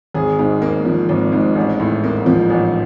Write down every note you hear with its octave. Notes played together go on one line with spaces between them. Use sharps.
G#1 G#4
G#2
A#3
F3
G#1
G#2
A1
A2
A#3
F3
A1